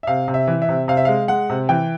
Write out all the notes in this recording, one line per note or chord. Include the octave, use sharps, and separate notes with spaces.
E5
C3 F5
C3
E5
E3
E5
C3
C3 F5
E5
G#3 F5
G#3 F#5
C3
E3 G5